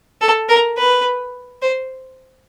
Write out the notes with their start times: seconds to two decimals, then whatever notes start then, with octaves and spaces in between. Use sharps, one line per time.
0.21 A4
0.49 A#4
0.78 B4
1.62 C5